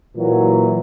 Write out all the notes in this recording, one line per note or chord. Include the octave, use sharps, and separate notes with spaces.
A#2 E3 F#3